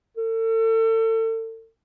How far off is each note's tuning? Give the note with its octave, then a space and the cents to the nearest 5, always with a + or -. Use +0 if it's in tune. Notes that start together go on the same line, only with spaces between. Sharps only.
A4 +35